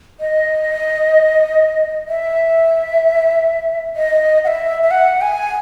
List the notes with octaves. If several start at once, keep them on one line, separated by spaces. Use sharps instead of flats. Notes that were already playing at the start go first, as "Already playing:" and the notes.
D#5
E5
D#5
F#5
E5
E5
F#5
G#5